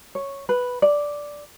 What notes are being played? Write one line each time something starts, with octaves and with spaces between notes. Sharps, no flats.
C#5
B4
D5